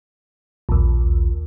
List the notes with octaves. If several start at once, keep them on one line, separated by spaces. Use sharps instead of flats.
A#1 D#2